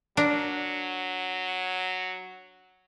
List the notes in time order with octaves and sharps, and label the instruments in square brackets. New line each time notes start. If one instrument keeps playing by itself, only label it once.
[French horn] F#3 [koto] D4 A#4